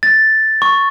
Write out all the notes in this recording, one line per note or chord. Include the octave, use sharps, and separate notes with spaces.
A6
C#6